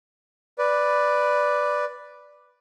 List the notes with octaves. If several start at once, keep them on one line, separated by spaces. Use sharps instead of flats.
B4 D5